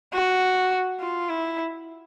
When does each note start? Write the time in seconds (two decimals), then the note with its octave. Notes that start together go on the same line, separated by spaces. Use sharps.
0.13 F#4
1.00 F4
1.29 E4